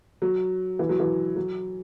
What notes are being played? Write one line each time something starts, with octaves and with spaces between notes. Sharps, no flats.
F#3
E3
F#3
E3
F#3